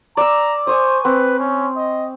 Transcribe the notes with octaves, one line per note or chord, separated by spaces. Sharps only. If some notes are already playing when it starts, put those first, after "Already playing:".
D5 A#5 E6
C5 G#5 C#6 D#6
C4 B4
C#4
D#5